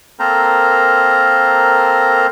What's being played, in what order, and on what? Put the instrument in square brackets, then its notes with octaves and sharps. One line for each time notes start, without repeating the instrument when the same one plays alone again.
[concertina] A#3 C4 A4 A#4 C5 A#5